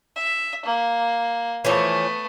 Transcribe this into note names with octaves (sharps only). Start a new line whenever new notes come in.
E5
A#3
E3 F3 A3 B3 C#5